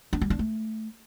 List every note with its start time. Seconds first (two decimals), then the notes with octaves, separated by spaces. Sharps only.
0.13 D4
0.21 G3
0.30 D4
0.39 A3